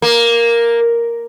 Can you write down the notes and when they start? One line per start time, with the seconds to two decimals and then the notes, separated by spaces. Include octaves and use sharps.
0.02 A#3